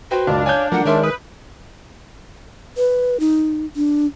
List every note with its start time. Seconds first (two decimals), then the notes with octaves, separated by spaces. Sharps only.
0.11 F#4 B4 C5 G5
0.27 F#1 C#2 D4 F5
0.46 C#5 G#5 G6
0.72 F3 F#3 A3 A#4 F#5
0.85 D#3 G#3 A#4 C#5 E5 C6
1.03 B4 D#6
2.77 B4
3.20 D#4
3.76 D4